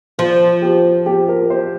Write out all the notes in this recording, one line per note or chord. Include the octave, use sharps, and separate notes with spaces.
F3 F4
G4
G4
A#4
C5